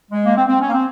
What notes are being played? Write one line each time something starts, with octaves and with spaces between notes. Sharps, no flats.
G#3
A#3
C4
C4
C#4
A#3
C4